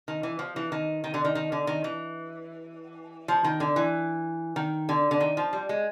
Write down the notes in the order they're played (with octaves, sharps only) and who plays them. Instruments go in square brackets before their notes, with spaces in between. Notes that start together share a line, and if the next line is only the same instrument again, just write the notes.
[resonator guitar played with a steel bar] D#3
E3
F3
E3
D#3
D#3
D3
D#3
D#3
D3
D#3
E3
F3
D#3
D3
E3
D#3
D3
D3
D#3
F3
G3
G#3